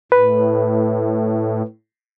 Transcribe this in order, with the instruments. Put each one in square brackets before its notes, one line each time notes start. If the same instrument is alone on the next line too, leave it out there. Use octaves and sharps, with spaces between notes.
[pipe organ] A2 [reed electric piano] B4